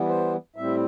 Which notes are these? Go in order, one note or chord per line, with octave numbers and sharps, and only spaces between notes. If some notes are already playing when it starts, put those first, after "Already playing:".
Already playing: E3 G3 B3
C5
A2 G3 C4 E5